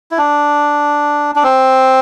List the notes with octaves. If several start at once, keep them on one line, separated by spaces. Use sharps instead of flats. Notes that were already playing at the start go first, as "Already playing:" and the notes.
E4
D4
D4
C4